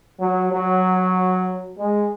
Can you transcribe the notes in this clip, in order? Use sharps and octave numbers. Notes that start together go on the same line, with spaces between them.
F#3
F#3
G#3